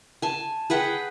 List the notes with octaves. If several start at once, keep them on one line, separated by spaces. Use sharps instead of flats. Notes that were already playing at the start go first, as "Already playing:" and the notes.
G#5 A5
G#4 B4 F#5 G5